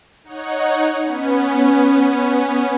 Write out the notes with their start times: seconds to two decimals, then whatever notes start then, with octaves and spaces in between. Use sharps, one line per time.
0.24 D#4 C#5 F#5
1.02 B3 C#4